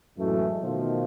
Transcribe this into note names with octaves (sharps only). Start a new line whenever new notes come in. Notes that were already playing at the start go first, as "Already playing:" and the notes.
F#2 A2 E3 G#3 A3
B2 D#3 F3 A3 F4